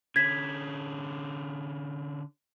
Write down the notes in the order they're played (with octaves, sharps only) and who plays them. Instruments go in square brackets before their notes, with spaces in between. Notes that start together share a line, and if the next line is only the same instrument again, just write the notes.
[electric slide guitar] D3 C#4 [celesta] G#6 B6